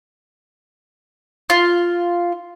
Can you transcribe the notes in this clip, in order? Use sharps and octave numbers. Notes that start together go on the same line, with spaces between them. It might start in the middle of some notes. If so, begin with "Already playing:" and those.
F4